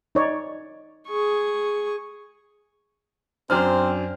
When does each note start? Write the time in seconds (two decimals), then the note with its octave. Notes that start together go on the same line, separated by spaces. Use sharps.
0.15 D#4 C#5 D5
1.08 G#4 C#6
3.50 F#2 C4 D4 C5 F6